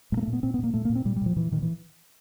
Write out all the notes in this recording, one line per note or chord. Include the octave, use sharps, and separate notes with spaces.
A#2 G#3
A#3
A3
A#2
B3
A#2 C4
B3
A#2 A#3
A#2 A3
A#3
A#2
C4
A#2 G3
G3
A#2 F3
A#2 E3
A#2 D#3
E3